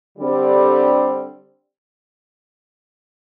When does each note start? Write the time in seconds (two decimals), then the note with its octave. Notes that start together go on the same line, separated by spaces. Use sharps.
0.18 D3 G3 C4